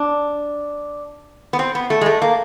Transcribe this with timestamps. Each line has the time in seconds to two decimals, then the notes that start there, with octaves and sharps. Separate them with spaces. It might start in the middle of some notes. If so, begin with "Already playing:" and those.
Already playing: D4
1.53 B3
1.59 C4
1.75 B3
1.90 A3
2.01 G#3
2.06 A3
2.22 A#3